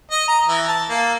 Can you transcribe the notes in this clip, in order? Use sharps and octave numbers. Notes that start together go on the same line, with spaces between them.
D#5
A#5
E3
A5
A#3